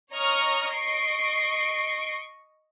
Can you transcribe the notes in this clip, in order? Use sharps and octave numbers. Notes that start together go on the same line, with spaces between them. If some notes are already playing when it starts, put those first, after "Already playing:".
C#5 D#5 A#5 C#6 D#6 F6
D#5 C#6 C7 D7